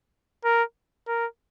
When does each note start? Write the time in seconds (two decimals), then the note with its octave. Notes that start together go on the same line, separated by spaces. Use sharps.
0.44 A#4
1.07 A#4